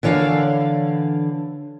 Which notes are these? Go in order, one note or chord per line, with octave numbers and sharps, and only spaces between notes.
D3 E3 C#5 D5 F5